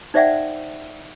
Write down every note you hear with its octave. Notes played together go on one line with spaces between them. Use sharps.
D#4 C5 D5 E5 F#5 G5